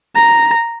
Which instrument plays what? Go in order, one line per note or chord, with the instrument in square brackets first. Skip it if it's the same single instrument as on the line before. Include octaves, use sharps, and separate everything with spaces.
[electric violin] A#5